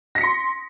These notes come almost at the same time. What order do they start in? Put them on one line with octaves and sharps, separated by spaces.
A#6 B6 C#7 C6